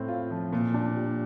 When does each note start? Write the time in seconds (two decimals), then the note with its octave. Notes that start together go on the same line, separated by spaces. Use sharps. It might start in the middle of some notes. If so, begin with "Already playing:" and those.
Already playing: A2 C4
0.08 F4
0.31 F3
0.53 A#2
0.74 D4
0.96 G4